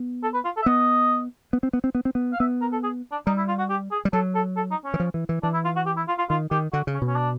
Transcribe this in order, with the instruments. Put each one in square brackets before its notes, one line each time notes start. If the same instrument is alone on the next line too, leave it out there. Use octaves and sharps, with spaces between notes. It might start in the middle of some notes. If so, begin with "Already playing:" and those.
Already playing: [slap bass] B3
[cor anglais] A4
B4
F4
A4
E5
[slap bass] B3 [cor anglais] D#5
[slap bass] B3
C4
B3
C4
B3
C4
B3
[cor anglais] F5
[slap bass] B3 [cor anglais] E5
[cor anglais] A#4
A4
G#4
D4
[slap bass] G3 [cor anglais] D#4
[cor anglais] E4
F4
F#4
G4
G#4
[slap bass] G3
[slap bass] F#3 [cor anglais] A4
[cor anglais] A4
A4
D#4
C#4
[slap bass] E3
F3
E3
E3
[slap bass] E3 [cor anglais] D4
[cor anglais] E4
F4
F#4
G4
E4
F4
F4
[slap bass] D#3 [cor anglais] F4
[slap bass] D#3 [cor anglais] G4
[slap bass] D3 [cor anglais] F#4
[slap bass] C#3
[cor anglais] C#4
[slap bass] B2
[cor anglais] C#4
D4